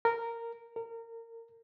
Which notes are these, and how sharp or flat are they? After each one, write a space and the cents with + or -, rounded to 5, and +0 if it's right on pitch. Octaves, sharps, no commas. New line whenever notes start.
A#4 -10
A#4 -25